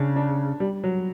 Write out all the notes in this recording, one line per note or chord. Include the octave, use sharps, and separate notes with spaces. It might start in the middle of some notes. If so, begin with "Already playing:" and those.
Already playing: C#3 C#4 D4
D4
G3
F#3